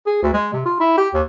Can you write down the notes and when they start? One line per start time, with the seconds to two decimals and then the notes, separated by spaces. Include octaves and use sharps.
0.06 G#4
0.22 D2
0.34 G#3
0.53 C3
0.66 F4
0.80 E4
0.98 G4
1.14 D#2